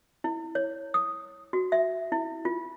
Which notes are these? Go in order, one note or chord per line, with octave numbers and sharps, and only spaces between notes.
E4
C#5
D#6
F#4
E5
E4
F4